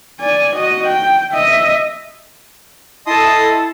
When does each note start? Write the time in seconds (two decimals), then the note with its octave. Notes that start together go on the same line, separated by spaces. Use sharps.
0.20 D5 G#5
0.56 F#4 D#5
0.87 G5
1.34 D#5 E5
3.07 E4 A4 D#5 A5 C6 D#6